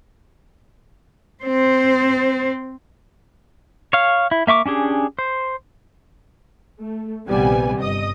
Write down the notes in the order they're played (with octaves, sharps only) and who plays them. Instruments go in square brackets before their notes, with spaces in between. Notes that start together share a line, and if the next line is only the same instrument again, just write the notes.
[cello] C4 C5
[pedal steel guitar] C#5 F5
E4
A#3 E5 C#6 D6
C#4 D4 G4 G#4
C5
[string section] A3
A#1 D#2 C3 G3 B3 G#5
G1 D#5 D#6